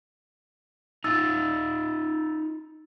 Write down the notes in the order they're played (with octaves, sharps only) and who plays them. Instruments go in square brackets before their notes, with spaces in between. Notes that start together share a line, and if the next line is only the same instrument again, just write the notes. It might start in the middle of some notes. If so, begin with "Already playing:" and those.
[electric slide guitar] D#4 F4 [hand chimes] E6 A6